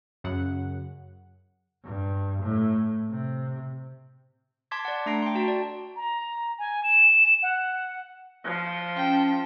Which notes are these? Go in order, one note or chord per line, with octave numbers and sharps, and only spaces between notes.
F#2 C#3 F#5
G2
A2
C3
A5 C6 D6 G#6 B6
D5 F#5
A3 D4 A#5 A#6 C7 D7
G5 C6
F#4 A5
D5
A#5
G#5
E7
F#5
F3
C#4 G5 A5